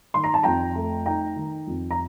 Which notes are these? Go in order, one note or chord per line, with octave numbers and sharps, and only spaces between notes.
D#3 C6
A#5
A5
F2 G5 A#5
A3
D#4 G5 A#5
D#3
F2
A#5